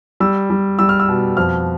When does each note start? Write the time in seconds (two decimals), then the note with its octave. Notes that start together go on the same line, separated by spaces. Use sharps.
0.20 G3 E6
0.50 G3
0.79 G3 E6
0.89 F6
1.00 E6
1.09 B2
1.37 F2 F6